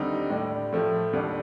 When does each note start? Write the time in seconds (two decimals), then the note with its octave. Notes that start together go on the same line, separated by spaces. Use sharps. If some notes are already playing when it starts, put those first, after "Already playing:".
Already playing: D#2 D3 G3 C4 D#4
0.30 A2 G3 D4
0.72 A2 F3 A3
1.13 D#2 D3 G3 D4